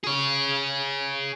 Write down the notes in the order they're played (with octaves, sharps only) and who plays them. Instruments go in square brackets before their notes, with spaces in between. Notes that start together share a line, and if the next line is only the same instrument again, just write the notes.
[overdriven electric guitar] G#4 C#5